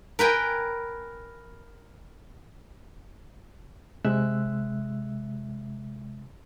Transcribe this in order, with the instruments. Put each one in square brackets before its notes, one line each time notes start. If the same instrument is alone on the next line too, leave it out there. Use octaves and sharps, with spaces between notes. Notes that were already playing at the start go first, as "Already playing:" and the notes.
[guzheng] A#4 B4 G5 G#5
[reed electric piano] C3 G#3 E5 E6 F#6